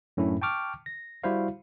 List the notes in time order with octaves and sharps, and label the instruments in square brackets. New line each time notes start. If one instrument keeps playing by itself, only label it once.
[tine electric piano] F#2 A2 C#4 D4 E4
G5 A5 C#6 D6 F6
A#6
G3 E4 F#4 C5 F5